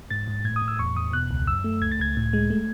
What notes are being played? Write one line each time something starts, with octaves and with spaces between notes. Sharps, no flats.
G#2 A6
G#2
A2 G#6
D#6
A2
E6
E2 C#6
E2 D#6
B2 F#6
C#2
F#2 E6
A3
C#2 G#6
A6
C#2 G#6
A2
G#3
A3